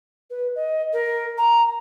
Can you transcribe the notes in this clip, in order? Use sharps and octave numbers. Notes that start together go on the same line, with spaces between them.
B4
D#5
A#4
A#5